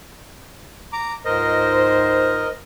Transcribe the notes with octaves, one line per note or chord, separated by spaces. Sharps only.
A#5 D6
C#2 G#2 A#4 C5 D#5